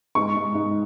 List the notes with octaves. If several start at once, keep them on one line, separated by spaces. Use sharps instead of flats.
G#2 C#6
G#2
G#2